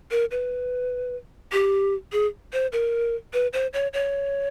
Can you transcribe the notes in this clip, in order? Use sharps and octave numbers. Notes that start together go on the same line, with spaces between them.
A#4
B4
G4
G#4
C5
A#4
B4
C5
C#5
C#5